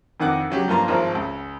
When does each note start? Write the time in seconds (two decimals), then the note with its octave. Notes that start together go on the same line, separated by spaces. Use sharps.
0.20 F2 D#3 F#5 D6 F#6
0.50 C#3 F#3 G4
0.68 G2 F3 A#3 F4 A#5 C6
0.88 G#1 F3 A#4 C5
1.15 C#2